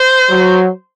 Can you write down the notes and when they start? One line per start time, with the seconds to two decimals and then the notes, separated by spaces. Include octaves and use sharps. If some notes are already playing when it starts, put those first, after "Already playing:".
Already playing: C5
0.30 F#3